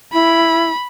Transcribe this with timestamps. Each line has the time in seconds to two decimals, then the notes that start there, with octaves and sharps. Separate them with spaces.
0.13 E4 B5